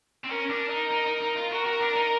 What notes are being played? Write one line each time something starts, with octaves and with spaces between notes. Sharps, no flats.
C4
C#4 A#4
D4
D#4
D#4
D#4
D#4
F4
F#4 A#4
F#4
D4
D#4